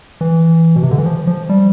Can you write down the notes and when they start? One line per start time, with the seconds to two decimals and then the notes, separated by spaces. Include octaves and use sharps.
0.21 E3
0.76 B2
0.83 C3
0.91 D3
0.98 E3
1.06 F3
1.27 F3
1.49 G3